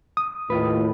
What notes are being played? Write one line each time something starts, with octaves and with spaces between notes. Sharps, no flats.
D#6
D#2 A2 F4 B4